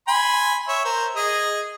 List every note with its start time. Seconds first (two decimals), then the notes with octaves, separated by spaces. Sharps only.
0.08 G#5 B5 C6
0.68 C#5 E5
0.85 A#4 C5
1.16 G#4 D#5